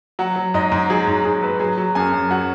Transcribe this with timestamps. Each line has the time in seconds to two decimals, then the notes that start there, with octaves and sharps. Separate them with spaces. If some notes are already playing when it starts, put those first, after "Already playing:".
0.19 F#3 F#5
0.36 F#3
0.54 G#2 D#5
0.72 G#2
0.90 F#3 G#4
1.07 G#2
1.25 G#2 G#4
1.43 F#3 B4
1.60 F#3 G#4
1.78 F#3
1.95 F#2 G#5
2.13 F#2
2.31 F#3 F#5